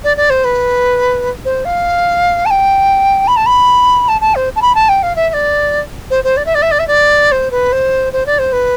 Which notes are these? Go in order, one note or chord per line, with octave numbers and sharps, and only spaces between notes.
D5
D5
C5
B4
C5
F5
A5
G5
B5
A5
B5
A5
A5
C5
A5
B5
A5
G5
F5
E5
E5
D5
C5
C5
D5
E5
D5
E5
D5
E5
D5
C5
B4
C5
C5
D5
C5
B4